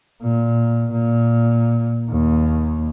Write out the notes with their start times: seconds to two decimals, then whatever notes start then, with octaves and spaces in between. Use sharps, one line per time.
0.22 A#2
0.92 A#2
2.10 D#2